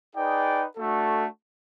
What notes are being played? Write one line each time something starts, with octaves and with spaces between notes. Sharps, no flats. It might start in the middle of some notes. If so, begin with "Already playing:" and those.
D#4 G#4 B4 D5 G5
A3 D4 F#4 A4